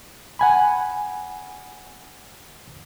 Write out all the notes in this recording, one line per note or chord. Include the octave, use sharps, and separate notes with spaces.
F#5 G#5 B5